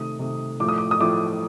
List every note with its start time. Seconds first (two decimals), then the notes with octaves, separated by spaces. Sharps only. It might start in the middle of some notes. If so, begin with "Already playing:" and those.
Already playing: C3 D#3 A3 D#6
0.19 C3 D#3 A3
0.60 A2 F3 A3 D6
0.69 D#6
0.78 D6
0.91 D#6
1.00 A2 F3 A3 D6